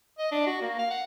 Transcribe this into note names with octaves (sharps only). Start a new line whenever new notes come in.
D#5
D4
F#4
A#3
F5
F#5